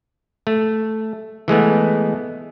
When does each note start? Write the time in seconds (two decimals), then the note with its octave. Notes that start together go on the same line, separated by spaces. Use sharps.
0.47 A3
1.48 E3 G#3 A3 B3